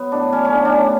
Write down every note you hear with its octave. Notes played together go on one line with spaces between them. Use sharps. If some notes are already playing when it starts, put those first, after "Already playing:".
Already playing: F#3 B3
A2 D4
F#3 C#4
C#4
A2 D4
D4
F#3 C#4